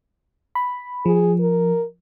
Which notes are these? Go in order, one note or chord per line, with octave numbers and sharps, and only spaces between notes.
B5
F3 G#4
A#4